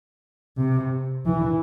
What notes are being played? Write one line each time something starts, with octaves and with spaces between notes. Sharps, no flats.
C3
E3